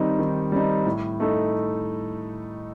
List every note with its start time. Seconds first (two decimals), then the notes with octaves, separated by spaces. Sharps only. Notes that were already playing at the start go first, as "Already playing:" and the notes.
Already playing: D#3 G3 C4 D#4
0.19 D#3
0.52 G3 C4 D#4
0.86 A2
1.20 A3 D#4 A4